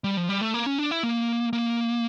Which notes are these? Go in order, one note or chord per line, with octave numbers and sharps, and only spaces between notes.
G3
F3
G3
A3
A#3
C#4
D4
E4
A#3
A#3